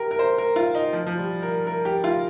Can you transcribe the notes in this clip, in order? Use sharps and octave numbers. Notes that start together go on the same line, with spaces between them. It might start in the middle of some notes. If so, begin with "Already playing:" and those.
Already playing: G4 A#4
A#4
C5
A#4
F4
D#4
F3
F3
G3
A#4
A#4
G4
F4